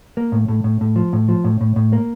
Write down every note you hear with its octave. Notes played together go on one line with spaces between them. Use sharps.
A#3
A2
A2
A2
A2
F3
A2
F3
A2
A2
A2
A#3